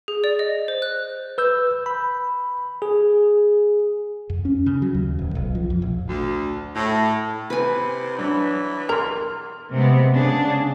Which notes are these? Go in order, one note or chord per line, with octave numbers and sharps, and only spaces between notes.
G#4
D5
D#5
C5
F#6
B4 E6 G6
B5
G#4
F2
C#4
C#3
F#3
D#2
D1
B1
F3
F2
A#1
D2
A2
C3 B4 G#5
E3 F#3 D4
A#4 C6 F6 F7
C3 G#3 B3
C#3 D4 G#4